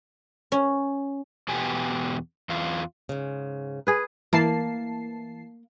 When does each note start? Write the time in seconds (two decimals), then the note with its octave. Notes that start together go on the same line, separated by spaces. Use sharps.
0.52 C#4
1.48 E2 B2 B3 G4 G#5
2.49 E2 F4
3.09 G#2 C#3
3.87 G#4 B4
4.33 E3 A#3 A5 C7